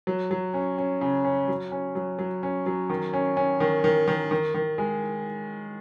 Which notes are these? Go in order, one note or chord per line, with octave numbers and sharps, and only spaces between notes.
F#3
F#3
C#4
C#4
C#3
C#4
F#3
C#4
F#3
F#3
C#4
F#3
D#3
C#4
C#4
D#3
D#3
D#3
D#3
D#3
G#3